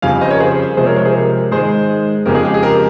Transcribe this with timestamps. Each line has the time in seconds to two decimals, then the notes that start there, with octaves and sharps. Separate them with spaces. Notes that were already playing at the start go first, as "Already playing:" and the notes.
0.02 F2 C#3 G3 F5 G#5
0.21 C5 D#5
0.30 A#4 C#5
0.40 G#4 C5
0.77 C3 F3 G#3 G#4 C5
0.86 A#4 C#5
0.96 A#4 C#5
1.05 G#4 C5
1.14 G4 A#4
1.51 G#2 D#3 G#3 G#4 C5
2.26 F2 C#3 G#3 G4 A#4
2.35 G#4
2.44 G4
2.54 G#4
2.63 G4 A#4